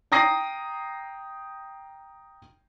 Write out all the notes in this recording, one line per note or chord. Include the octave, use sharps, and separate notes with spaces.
G5 A#5 D#6 A#6 C7 D#7